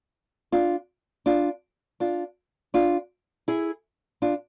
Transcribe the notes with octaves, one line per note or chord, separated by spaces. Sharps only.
D4 F4
D4 F4
D4 F4
D4 F4
E4 G#4
D4 F4